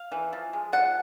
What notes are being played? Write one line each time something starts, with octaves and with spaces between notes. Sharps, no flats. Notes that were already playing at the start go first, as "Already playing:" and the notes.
Already playing: F5
E3
F3
G#3
F3 F#5